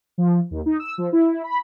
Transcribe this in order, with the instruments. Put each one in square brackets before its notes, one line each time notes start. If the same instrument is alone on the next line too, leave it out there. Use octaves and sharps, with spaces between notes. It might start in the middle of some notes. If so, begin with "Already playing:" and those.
[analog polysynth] F3
D#2
D#4
E6
F3
E4
B5